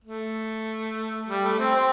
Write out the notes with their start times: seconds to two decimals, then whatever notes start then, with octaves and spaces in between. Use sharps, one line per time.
0.04 A3
1.28 G3
1.44 A3
1.59 C4
1.75 C4